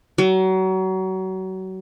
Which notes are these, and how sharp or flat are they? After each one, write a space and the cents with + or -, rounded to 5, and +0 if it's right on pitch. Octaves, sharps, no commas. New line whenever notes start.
F#3 +30